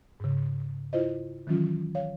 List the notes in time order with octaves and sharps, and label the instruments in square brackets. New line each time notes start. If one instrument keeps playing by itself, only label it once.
[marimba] G#2 C#3
E4 F4 C5 D#5
D#3 E3 F#3 C#4 F4
C#5 F5